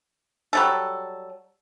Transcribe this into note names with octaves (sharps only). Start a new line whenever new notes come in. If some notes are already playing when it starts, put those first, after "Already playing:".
F#3 G3 A4